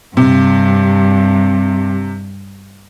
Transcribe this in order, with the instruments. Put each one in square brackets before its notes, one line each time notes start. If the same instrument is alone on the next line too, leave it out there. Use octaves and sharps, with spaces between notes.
[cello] G2 [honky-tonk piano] C3